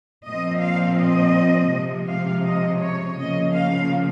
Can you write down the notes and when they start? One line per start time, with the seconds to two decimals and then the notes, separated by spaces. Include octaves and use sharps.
0.25 A#2 F3 C4 D#5
0.61 F5
0.98 D#5
1.70 C3 F3 G#3
2.07 F5
2.44 D#5
2.79 C#5
3.16 C#3 F3 A#3 D#5
3.53 F5